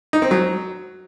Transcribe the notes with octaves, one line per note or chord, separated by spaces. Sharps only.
D#4
C4
F#3